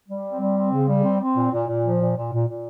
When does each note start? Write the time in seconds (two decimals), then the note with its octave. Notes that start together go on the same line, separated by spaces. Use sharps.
0.08 G3
0.24 C4
0.40 G3
0.56 C4
0.72 C#3
0.88 G3
1.04 C4
1.20 C4
1.36 A#2
1.52 A#2
1.67 A#2
1.84 F3
2.00 A#2
2.16 A#2
2.32 A#2
2.47 A#2